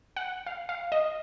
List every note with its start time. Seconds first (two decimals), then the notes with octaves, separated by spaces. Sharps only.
0.17 F#5
0.46 F5
0.69 F5
0.92 D#5